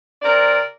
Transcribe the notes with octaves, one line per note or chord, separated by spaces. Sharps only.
C3 A#4 D5